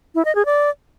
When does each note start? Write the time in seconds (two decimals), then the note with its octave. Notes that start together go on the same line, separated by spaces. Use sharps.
0.15 E4
0.25 D#5
0.35 G#4
0.46 D5